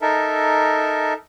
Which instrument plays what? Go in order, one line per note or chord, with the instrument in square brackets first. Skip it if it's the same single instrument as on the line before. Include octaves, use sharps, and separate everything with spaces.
[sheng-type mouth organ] D#4 A4 A#4 E5